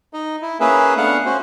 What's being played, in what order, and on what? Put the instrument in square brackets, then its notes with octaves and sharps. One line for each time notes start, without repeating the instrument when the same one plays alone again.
[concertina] D#4 D#5
E4
A#3 C#4 G#4 B4 E5
A3 B3 D4 F5 F#5
C#4 F#4 C5